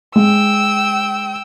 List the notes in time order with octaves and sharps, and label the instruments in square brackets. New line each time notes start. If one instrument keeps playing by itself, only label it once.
[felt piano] G#3 [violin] G5 E6